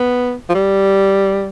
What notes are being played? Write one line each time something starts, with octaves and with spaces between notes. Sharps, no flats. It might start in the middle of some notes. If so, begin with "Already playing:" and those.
Already playing: B3
F3
G3